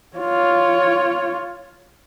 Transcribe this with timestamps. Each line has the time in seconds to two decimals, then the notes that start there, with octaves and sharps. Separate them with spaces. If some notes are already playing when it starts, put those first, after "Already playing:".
0.17 F4 C#5